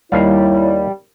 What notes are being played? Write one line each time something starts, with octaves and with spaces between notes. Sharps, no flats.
D#2 G3 E4 C#5 F5